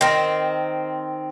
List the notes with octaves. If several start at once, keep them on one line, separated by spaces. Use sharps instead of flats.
D#3 C4